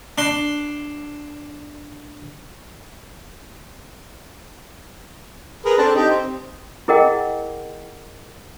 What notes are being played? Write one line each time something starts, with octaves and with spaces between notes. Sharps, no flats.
D4 C6
G#4 A#4 B4
C4 D4 A4
D#4 G4
C4
E4 G#4 A#4 D#5 F#5 G5